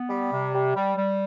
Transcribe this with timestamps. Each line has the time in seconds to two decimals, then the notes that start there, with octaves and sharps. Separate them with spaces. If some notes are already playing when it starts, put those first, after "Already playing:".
Already playing: B3
0.09 G3
0.32 C3
0.53 G3
0.75 G3
0.97 G3